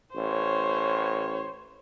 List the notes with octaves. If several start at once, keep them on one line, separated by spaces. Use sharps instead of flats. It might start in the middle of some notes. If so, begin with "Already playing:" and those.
A1 C5 C#5